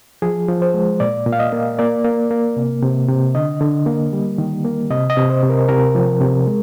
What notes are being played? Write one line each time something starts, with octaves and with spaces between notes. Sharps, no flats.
F3 G#4
F3
C5
G#3
A#2 D5
A#2
F5
D#5
A#3
A#3 D5
A#3
A#3
C3
C3
C3
D3 D#5
D3
A#3
G3
D#3
A#3
C3 D#5
D#5
C3
C5
C3
A#4
C3 A#4
F3
C3
G#3